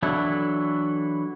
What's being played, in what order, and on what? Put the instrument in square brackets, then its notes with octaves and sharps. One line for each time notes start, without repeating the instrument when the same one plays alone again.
[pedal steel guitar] E3 F#3 D4 E4 A4